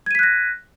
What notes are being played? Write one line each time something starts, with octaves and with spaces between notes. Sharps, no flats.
F#6 G#6 A#6 B6 D#7